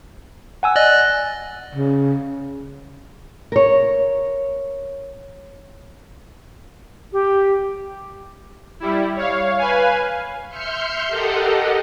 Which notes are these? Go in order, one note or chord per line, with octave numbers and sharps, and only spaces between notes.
F#5 G#5 E6
D5 D#5 F#6
C#3
A#4 C#5
G4
G3 E4
C#5 F5
B4 F5 G#5
E5 C6 F6 G6 C7 C#7
G4 A4 A#4 D#5 F#5